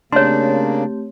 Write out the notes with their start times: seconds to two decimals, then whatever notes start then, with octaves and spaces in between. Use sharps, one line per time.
0.13 C#3 A3 A#3 C4 D4 G4 C#5 C6